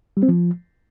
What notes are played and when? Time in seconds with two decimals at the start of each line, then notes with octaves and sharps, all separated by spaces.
0.17 G3
0.23 C4
0.28 F3